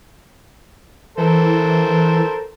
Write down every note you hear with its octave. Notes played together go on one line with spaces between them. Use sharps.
E3 A4 A#4 C5